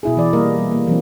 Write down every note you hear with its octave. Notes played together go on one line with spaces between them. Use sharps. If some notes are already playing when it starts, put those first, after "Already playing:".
B2 E4 G#4
E3 D5
G3 A#3 A#4 D#5
G3
A#3
E3 F#3 C4